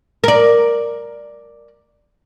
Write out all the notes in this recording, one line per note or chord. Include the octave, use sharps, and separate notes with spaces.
A#4 D5